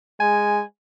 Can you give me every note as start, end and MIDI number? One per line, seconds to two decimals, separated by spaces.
0.20 0.63 56
0.20 0.61 80